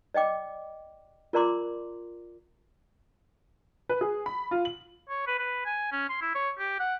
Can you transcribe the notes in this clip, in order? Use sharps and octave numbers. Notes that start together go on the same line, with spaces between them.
D5 D#5 G5 D6
F4 A#4 D5 A#5 C6 D6
B4
G#4
B5
F4
F#7
C#5
B4
B4
G#5
C#4
C6
E4
C#5
G4
F#5